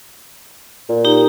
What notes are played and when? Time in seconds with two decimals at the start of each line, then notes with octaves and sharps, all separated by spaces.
0.89 A#2
1.04 D#4 G4 A#5